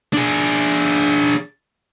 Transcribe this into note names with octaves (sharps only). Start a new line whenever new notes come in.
D4 G#4